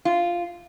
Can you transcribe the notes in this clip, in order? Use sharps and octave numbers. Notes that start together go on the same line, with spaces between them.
F4